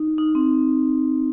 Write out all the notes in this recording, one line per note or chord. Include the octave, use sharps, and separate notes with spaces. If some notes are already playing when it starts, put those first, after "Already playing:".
Already playing: D#4
D#4
C4